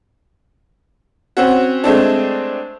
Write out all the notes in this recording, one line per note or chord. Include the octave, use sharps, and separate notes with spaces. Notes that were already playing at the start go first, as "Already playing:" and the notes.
C4 C#4 F#4
G#3 A3 C4 D4